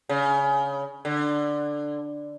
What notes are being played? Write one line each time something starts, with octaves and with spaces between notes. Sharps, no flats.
C#3
D3